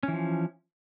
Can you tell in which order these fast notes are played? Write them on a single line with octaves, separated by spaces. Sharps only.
C#4 E3 F3